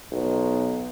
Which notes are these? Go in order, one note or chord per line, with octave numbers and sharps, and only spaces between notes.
B1